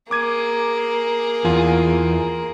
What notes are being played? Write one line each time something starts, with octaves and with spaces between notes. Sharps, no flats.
A#3 G#4 D6 G#6 D#7
E2 F4 G#5